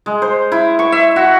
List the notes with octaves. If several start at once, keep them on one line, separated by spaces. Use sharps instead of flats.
G#3
C5
E4
C#6
E5
F#4